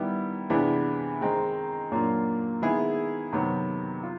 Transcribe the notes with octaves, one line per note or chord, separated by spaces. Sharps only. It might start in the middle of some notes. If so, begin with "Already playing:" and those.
Already playing: D#3 G3 B3 E4
C3 E3 G#3 B3 D4
D#3 G#3 C4 D#4
A#2 F#3 A#3 D4 F4
D#3 G#3 B3 E4 G#4
C3 D#3 F#3 B3
F4